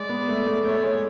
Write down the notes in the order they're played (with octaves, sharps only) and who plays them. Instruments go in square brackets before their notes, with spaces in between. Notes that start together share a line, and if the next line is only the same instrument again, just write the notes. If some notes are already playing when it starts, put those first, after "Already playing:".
Already playing: [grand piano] G#3 [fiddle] D5
[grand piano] B3
A3
A3
[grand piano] A3 [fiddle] C#5
[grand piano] G#3